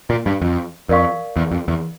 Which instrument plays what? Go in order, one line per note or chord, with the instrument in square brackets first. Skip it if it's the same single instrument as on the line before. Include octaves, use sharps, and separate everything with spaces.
[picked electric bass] A#2
G2
F2
[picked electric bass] F2 [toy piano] A#4 D5 F5 C#6
[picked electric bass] E2
F2
E2